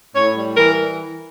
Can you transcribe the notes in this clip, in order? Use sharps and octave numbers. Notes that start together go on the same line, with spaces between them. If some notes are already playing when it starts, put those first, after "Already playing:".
A2 C#5
G3
E3 A#4